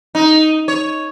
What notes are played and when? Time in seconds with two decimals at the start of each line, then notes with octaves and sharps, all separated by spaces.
0.15 D#4
0.68 C#5